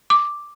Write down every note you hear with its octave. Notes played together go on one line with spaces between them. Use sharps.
D6